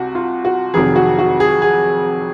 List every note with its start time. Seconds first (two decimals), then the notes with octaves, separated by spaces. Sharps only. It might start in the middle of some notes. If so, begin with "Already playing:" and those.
Already playing: C2 C3 F#4
0.15 F4
0.45 F#4
0.74 F1 F2 C3 D#3 F#3 G#4
0.96 F#4
1.19 F#4
1.40 G#4
1.62 G#4